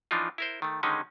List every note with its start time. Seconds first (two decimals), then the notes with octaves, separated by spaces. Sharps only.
0.11 E3 F3 D4 D#4 F4
0.38 E4 A#4 C5
0.62 D#3 A3
0.83 D3 D#3 G#3 C#4 D#4